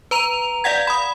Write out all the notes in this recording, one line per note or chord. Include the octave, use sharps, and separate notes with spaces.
B4 A#5 F7
D5 F5 F#5 G#6
B5 D#6